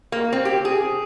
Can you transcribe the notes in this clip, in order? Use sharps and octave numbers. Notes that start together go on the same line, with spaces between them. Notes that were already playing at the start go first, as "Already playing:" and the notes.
A#3
C4
G4
G#4